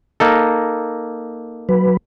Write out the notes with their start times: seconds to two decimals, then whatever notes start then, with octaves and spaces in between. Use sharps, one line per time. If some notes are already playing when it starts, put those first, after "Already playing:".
0.20 A#3 D#4 A4
1.69 F#3 B4